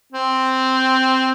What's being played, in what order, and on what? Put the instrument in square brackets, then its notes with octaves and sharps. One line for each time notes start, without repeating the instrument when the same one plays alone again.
[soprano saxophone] C4